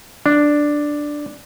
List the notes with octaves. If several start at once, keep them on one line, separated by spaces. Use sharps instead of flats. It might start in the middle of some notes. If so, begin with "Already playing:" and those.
D4